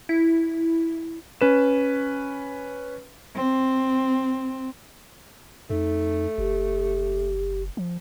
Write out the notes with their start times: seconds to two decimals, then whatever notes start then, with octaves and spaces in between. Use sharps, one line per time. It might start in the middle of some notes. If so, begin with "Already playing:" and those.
0.09 E4
1.41 C#4 B4 E7
3.37 C4
5.70 F2 A3 D#4
6.38 F#1 G4
7.77 F3